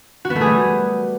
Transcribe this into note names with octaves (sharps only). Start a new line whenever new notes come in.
F#4
B3
A3
G#4
G3